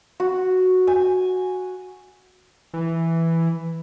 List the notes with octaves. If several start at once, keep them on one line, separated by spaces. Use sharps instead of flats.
F#4
G#5
E3